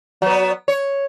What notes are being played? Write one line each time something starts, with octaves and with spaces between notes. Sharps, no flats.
F#3 B3
C#5